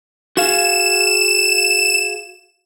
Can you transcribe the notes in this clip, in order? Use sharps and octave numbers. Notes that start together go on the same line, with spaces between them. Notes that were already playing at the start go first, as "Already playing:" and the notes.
F#4 G#4 F5 E7